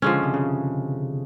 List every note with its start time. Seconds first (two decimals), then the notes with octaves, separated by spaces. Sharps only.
0.02 D3 F3 G#3 C#4
0.12 C#3
0.23 C3
0.34 C#3